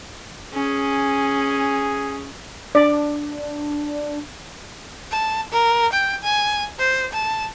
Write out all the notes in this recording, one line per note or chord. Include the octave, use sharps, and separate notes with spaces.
C#4 G#4
D4 D5
A5
A#4
G5
G#5
C5
A5